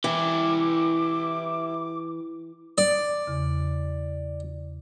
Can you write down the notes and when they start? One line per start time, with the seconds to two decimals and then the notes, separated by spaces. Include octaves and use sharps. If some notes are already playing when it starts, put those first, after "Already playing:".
0.04 E3 E4 G4 D6
2.78 D5
3.27 E2 C#3